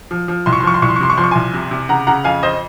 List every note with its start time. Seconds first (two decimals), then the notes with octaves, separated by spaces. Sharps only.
0.11 F3
0.28 F3
0.46 C2 C6
0.53 C#6
0.60 C6
0.63 F3 C#6
0.74 C6
0.82 C2 C#6
0.89 C6
0.96 C#6
1.00 C3 C6
1.10 C#6
1.17 F3 C6
1.24 C#6
1.31 C2 G#5 C6
1.54 C3
1.71 C3
1.89 C#3 F#5 A#5
2.07 C#3 F#5 A#5
2.24 F2 F5 G#5
2.43 F2 C5 D#5